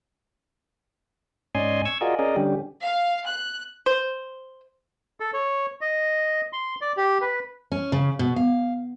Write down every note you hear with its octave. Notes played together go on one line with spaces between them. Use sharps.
G#2 C#4 D5 D#5 G#5 C6
C#6 E6 G#6
F4 F#4 G#4 A#4 D5 D#5
C#4 G#4 A#4 D5 D#5
D3 G3 C#4 G4
F5
F#6
C5
A4
C#5
D#5
C6
D5
G4
B4
C#4
C#3
B2
F5